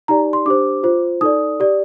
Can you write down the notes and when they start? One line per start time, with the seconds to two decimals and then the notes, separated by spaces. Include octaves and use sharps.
0.08 D#4 G4 D5 A#5
0.33 C6
0.46 D4 G4 C5 D6
0.83 F4 C5
1.21 D#4 A4 D5 D#6
1.60 G4 D5